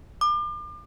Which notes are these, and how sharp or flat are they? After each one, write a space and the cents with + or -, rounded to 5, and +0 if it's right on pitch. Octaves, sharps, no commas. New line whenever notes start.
D6 +35